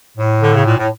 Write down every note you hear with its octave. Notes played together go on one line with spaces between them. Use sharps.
A2
D3
C#3
A#2
A2